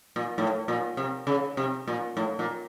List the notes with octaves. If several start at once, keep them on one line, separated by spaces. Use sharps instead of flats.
A#2
A2
A#2
C3
C#3
C3
A#2
A2
A#2